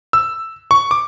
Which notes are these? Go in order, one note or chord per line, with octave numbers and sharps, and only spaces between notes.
E6
C#6
D6